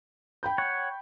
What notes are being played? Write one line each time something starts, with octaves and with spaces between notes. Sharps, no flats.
G5 B5 G6
C#5 F#5